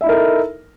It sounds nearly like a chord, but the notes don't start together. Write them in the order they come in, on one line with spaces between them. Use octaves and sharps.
E5 E4 D#4 A#4 A4